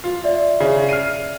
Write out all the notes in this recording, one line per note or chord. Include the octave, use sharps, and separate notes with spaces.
F4
D5 E5
C#3
F6 C7 D#7